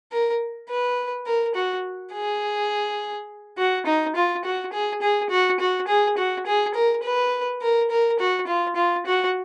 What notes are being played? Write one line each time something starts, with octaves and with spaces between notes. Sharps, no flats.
A#4
B4
A#4
F#4
G#4
F#4
D#4
F4
F#4
G#4
G#4
F#4
F#4
G#4
F#4
G#4
A#4
B4
A#4
A#4
F#4
F4
F4
F#4